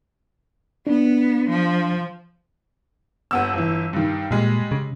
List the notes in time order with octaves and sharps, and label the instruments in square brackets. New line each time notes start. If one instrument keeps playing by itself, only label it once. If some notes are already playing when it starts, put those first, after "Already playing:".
[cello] B3 [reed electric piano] D4
[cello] F3
[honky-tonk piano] G1 B3 E6
G1 E3
G2 D#3
[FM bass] A#2 [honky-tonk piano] G3 G#3
[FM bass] C#3